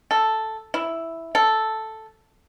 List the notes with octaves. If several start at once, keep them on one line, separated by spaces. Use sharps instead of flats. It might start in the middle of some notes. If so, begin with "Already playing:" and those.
A4
E4
A4